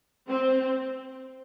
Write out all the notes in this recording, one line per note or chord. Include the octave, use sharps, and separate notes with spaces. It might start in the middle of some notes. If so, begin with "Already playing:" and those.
C4